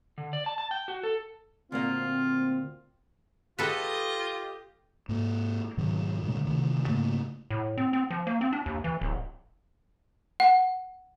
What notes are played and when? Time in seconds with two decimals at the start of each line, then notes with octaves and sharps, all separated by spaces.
0.18 D3
0.33 D5
0.46 A5
0.58 A5
0.71 G5
0.88 F#4
1.03 A4
1.72 D2 A#2 A#3 C4 F4
3.59 F4 G4 A4 B4 D#5
5.09 G#2 A#3
5.77 G#2 B2 D#3 F#3
6.23 G2 A#2 D3 G#3
6.45 D2 C3 D#3
6.88 G#2 C#3 A3 A#3
7.50 A2
7.78 C4
7.93 C4
8.11 F3
8.27 A#3
8.41 C4
8.53 D4
8.66 D#2
8.84 E3
9.01 D1
10.40 F#5